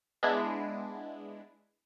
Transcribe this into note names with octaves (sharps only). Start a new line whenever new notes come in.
G#3 B3 D4 E4